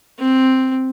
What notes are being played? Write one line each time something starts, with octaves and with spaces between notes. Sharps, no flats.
C4